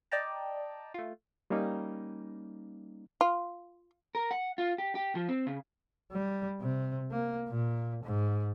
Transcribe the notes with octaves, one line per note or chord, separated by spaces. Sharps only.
D5 D#5 G5 A5 A#5
A3 F4
G3 A#3 C#4 D#4
F4
A#4
F#5
F4
G4
G4
F3
C4
C#3
G3
C3
A#3
A#2
G#2